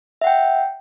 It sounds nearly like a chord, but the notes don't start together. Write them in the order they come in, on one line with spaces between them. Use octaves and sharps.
E5 F#5 G5